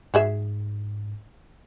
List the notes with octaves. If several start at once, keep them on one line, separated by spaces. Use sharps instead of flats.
G#2 F#4 G#4 E5